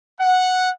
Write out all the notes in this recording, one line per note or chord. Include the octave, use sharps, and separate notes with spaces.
F#5